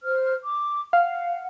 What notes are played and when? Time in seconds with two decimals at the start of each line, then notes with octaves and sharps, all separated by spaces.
0.03 C5 F6
0.45 D6
0.93 F5 F#5